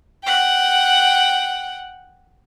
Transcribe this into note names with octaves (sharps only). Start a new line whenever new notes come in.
F#5 G5